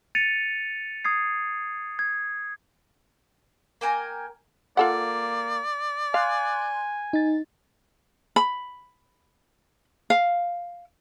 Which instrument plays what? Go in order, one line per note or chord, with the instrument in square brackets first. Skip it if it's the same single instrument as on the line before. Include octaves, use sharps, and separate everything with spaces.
[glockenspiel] A6 C#7 D#7 F7
D#6 G#6 C7
G#6
[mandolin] A#3 G5 G#5 A#5
[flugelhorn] A#3 [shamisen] F4 A4 F#5 [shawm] D5
[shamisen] F5 [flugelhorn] G#5 [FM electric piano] C6 F#6
[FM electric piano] D#4 A6
[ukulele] B5
F5